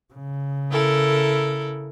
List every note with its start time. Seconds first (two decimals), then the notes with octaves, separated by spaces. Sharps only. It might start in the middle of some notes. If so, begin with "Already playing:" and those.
0.14 C#3
0.71 E4 A4 A#4